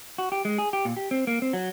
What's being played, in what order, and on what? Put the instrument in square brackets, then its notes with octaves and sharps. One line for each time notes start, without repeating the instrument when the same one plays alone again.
[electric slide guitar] F#4
G4
G#3
G#4
G4
A#2
G4
C4
A#3
C4
F#3